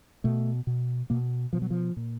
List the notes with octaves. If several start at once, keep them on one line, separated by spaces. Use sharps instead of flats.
B2 A3
B2
B2 A#3
B2 F3
F#3
F3
A#2